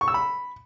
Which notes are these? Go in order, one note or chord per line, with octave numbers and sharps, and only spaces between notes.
C#6
E6
B5